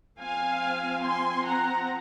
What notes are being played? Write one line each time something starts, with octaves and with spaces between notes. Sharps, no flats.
F3 C4 F5 G#5
G#5 C6
F#5 A#5